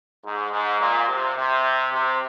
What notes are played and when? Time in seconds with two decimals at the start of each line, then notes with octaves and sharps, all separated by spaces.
0.24 G#2
0.52 G#2
0.80 A#2
1.08 C3
1.36 C3
1.92 C3